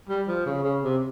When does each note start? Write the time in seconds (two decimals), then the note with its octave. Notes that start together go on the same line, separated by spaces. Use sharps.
0.09 G3
0.28 F3
0.46 C#3
0.64 C#3
0.83 C3